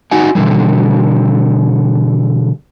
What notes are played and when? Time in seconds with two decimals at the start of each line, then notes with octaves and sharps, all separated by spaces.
0.11 D#4 F#4 D#5 F#5 G#5
0.35 B2 D3 E3 G3